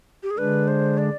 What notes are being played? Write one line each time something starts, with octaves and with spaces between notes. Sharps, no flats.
G4
G#4
D3 G#3 D4 B4
C5
D5